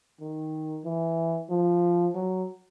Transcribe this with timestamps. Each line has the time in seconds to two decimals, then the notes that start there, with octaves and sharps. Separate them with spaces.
0.20 D#3
0.84 E3
1.49 F3
2.15 F#3